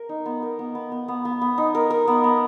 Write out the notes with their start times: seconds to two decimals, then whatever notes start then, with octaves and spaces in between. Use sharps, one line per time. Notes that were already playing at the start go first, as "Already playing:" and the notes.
Already playing: A#4
0.09 D#4
0.26 B3
0.42 A#4
0.59 B3
0.75 B3
0.92 B3
1.08 B3
1.25 B3
1.41 B3
1.58 D#4
1.75 A#4
1.90 A#4
2.08 B3
2.24 B3